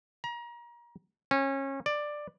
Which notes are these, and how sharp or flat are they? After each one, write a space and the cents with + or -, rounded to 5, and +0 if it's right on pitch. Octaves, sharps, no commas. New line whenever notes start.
A#5 +30
C#4 -25
D5 +10